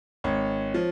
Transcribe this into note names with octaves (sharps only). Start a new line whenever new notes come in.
G#1 C#5
F3